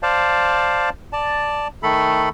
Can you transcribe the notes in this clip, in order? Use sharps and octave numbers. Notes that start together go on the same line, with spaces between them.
C5 D5 F5 A5
D5 A5
D#3 A3 A4 B5